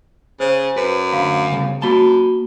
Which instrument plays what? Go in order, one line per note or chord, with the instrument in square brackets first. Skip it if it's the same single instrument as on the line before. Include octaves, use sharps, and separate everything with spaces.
[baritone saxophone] C#3 [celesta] C5
[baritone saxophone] F#2 [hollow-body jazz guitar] B4
[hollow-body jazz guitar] D2 B5 [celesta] F5
[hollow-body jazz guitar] C#3 G3
[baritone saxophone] F#2 [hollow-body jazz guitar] A#3 A5 [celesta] F#4 B5 G7